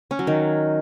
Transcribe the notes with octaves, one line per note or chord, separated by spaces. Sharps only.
C#4
F#3
D#3